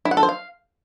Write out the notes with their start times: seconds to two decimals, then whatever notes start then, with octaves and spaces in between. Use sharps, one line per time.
0.05 E4
0.11 F#5
0.17 A4
0.23 C5
0.29 F5